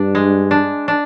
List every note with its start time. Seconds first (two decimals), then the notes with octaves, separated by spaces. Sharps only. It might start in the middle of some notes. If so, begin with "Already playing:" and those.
Already playing: G2 D4
0.15 G#3
0.51 D4
0.88 D4